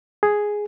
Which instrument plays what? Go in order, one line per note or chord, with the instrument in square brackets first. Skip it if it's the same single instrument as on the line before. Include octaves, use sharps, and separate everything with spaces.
[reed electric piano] G#4